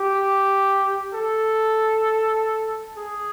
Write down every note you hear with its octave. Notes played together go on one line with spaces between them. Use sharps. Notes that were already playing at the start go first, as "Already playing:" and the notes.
Already playing: G4
A4
G#4